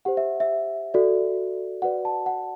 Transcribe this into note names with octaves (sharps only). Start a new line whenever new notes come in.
G4 C5 F#5
E5
E5
F#4 A4 D5
F#4 B4 D5 F#5
A5
F#5